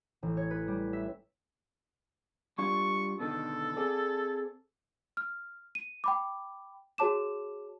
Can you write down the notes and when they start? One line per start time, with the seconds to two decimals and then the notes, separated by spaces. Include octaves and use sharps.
0.23 A1
0.37 C#5
0.51 B4
0.68 G3
0.93 E5
2.58 G3 D4 F4 C#6
3.20 B2 D3 D#3 A4
3.77 C4 G#4 D5
5.17 F6
5.75 D#7
6.04 G5 B5 D6
6.98 F#4 G#4 C#5 A5 D6 E7